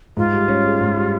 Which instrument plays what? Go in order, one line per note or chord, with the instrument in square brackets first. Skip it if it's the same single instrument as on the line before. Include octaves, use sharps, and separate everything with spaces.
[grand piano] G#2 [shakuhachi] F4
[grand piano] G3
C#4
G#4
G#2
G3